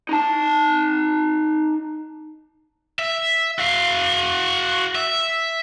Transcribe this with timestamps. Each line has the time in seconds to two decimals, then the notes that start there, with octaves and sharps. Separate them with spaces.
0.09 D#4 A5
2.99 E5
3.59 F#4 F5
4.95 E5